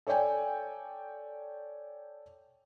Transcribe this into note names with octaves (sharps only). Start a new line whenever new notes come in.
A4 C#5 D5 G5 G#5